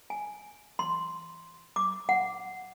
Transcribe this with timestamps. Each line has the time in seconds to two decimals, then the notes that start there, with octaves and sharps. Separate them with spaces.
0.10 G#5
0.79 C6
1.76 D6
2.09 F#5